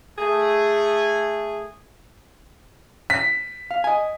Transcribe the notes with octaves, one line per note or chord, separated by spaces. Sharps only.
A3 G#4
B6
F5
D#5 G#5